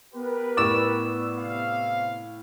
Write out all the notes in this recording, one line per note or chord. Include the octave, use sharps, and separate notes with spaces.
B3 G4 A#4 B4
A2 D5 C#6 D6 E6
C3 F5